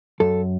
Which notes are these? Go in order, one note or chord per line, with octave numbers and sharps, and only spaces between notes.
F#2 A4